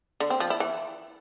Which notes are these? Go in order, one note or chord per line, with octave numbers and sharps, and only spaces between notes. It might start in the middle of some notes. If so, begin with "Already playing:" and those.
D3
C4
F3
E4
E3